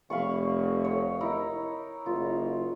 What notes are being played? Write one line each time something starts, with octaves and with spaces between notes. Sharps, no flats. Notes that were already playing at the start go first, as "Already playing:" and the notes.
F1 F5 B5 C#6
C#5
D#4 E4 A#4
F#1 F4